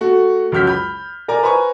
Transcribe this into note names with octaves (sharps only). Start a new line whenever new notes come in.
A3 F#4
C#2 F#2 F#4 F6 G6 B6
B5 G6
A#4 D5 G#5 A#5
B4 C5 G#5 A#5 C#6